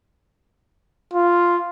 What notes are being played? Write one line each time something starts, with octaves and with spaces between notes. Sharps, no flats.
F4